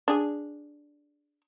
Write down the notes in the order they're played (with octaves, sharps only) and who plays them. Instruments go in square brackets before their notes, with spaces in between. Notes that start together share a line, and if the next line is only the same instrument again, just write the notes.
[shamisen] D4 G#4